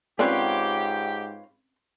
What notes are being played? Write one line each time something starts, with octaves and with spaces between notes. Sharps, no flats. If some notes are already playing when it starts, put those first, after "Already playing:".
G#2 C4 C#4 F4 G4 B4 C#5 D5